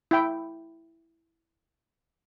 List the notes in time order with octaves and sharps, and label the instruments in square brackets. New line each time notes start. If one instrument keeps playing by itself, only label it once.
[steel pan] E4 G5